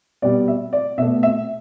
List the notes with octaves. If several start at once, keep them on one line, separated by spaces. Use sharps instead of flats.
B2 G3 D5
E5
D5
B2 A3 E5
E5